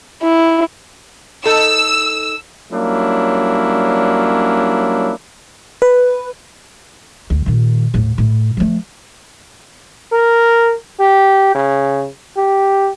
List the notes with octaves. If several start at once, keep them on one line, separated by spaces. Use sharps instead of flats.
E4
D#4 A4 E6
F#3 G3 A#3 C#4 D4 E4
B4
D2
A#2 D#3
D#2 A2
A2
F3 A3
A#4
G4
C#3
G4